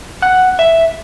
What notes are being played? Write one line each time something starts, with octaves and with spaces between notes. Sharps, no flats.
F#5
E5